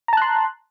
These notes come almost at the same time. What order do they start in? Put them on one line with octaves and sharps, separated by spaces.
A#5 A5 F#6 C6